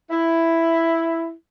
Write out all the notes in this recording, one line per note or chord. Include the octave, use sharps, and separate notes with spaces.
E4